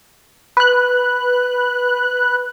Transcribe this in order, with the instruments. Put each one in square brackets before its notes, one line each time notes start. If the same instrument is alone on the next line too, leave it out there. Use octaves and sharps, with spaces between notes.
[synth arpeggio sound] B4 F#6